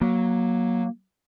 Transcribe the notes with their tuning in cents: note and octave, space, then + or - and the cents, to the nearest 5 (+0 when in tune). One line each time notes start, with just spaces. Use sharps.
F#3 +0 A#3 +15